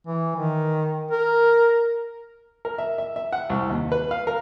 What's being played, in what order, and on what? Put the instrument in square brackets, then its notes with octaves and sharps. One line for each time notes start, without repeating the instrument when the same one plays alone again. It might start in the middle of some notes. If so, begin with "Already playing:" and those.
[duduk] E3
D#3
A#4
[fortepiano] A#4
E5
E5
E5
F#5
C2
D#2
B4
F5
A#4